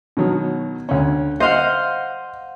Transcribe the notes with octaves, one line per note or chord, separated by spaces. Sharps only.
B2 D#3 F#3
D2 C#4
C5 D#5 F5 F#5